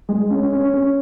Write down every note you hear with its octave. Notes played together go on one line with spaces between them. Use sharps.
G#3
C#4
C#4
C#4